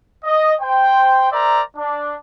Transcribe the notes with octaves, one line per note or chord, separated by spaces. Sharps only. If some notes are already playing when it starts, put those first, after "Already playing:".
D#5
C5 G5
A#4 C5 D5 E5 A#5
D4